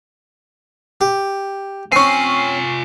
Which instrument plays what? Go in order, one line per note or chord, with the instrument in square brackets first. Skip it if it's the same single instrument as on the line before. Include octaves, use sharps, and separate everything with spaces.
[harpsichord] G4
[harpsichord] C4 C#4 [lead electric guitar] F4 G#5 [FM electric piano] C#6 C7